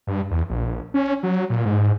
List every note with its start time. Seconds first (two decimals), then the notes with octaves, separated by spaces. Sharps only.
0.07 G2
0.31 E2
0.50 A#1
0.94 C#4
1.23 F#3
1.50 A#2
1.65 G#2